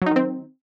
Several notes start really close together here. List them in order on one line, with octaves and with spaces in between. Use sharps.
F#3 D#4 D#3 C4